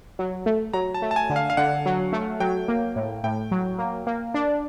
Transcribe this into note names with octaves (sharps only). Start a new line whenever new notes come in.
F#3
A3
F#3 A#5
A5
A3
A5
G#5
D3
F5
F5
D3 F#5
F#3
A3
F#3 G5
A#3
A2
A2 G5
F#3
A#3
A#3
D4